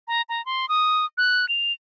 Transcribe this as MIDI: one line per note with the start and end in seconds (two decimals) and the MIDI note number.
0.08 0.22 82
0.29 0.44 82
0.46 0.68 84
0.69 1.05 87
1.18 1.48 90
1.49 1.72 101